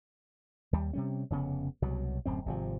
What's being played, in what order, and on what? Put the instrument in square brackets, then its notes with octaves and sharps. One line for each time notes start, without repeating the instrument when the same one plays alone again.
[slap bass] D#2 G3
C3 G3 C#4
F1 C#3 B3
C2 B2 F#3
D1 F#2 C4
G#1 C3 F3